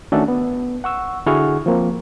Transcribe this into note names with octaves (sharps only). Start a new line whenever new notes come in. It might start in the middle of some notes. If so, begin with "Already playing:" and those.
D#3 A3 C#4 D4 F#4 A4
B3
F#5 C#6 E6
D3 E4 F#4 G#4 C#6 F6
F3 A#3 C4